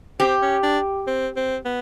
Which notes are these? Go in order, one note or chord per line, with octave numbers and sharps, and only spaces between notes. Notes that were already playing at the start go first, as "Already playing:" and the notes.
C4 G4
C#4
D4
C4
C4
B3